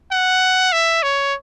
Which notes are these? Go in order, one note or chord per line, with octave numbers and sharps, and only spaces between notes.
F#5
E5
C#5